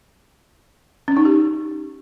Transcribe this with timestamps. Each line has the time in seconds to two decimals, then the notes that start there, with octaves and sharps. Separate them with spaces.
1.08 C#4
1.17 D#4
1.25 G4